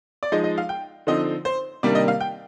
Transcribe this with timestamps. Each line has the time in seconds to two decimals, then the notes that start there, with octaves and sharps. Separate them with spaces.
0.23 D5
0.32 F3 G#3 D#4 D#5
0.44 D#5
0.58 F5
0.69 G5
1.07 D3 F3 C4 D#4 D#5
1.45 C5
1.83 C3 D#3 G3 A#3 D4 D5
1.95 D#5
2.08 F5
2.21 G5